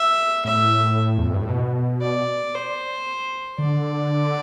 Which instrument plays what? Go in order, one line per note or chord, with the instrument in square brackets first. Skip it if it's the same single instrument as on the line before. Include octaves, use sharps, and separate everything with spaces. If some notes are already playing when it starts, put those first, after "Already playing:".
Already playing: [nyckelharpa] E5
[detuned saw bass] A2 [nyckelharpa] E5
[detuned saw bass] E2
F2
G2
A2
B2
[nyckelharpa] D5
C5
[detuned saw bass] D3 [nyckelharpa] D5